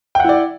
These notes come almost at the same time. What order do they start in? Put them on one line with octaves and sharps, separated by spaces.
G5 F#5 E4 D5